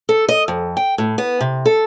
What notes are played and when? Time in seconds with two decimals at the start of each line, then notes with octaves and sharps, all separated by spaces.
0.09 A4
0.29 D#5
0.48 F2
0.77 G5
0.98 A2
1.18 B3
1.41 C3
1.66 A4